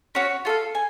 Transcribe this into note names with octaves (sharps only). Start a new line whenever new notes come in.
C#4 F#4 C#5
F4 A4 F5
G#5